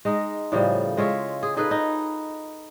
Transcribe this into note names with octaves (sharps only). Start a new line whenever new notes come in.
G#3 D#4
A2 C#3 F3 G3
G#3 F4 C#5 E5
G#4
D#4 G#4 A4 B4
D#4